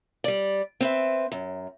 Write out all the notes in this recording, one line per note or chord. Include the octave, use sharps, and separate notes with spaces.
G3 D5
C4 B4 E5
F#2